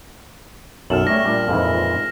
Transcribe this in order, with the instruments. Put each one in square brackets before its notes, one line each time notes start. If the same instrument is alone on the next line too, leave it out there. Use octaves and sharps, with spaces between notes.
[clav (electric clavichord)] B1 F#2 A4 [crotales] F6 E7 F#7
[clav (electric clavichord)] G3 C#4 [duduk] A3 [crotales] A#6
[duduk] A#2 [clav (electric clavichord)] G3 D4
[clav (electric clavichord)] F2 G#2 E3